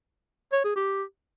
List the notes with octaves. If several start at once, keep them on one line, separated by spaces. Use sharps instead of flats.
C#5
G#4
G4